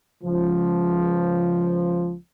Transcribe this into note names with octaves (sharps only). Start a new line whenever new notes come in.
C#2 F3